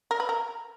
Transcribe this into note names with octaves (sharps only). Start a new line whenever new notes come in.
A#4
B4
A#4